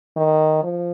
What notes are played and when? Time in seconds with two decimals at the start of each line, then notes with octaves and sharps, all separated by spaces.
0.16 D#3
0.63 F3